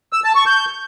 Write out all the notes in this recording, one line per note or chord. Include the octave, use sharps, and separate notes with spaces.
E6
A5
C#6
G6